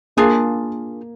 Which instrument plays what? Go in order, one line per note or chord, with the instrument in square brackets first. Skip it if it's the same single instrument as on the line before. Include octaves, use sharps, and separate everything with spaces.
[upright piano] A#3 [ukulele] D4 F4 G#4